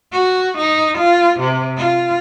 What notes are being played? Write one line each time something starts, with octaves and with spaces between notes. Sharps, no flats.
F#4
D#4
F4
C3
F4